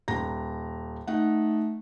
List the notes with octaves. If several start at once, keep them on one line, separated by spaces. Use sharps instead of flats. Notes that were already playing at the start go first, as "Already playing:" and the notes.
D#1 A#5 A#6
A3 D#4 F#5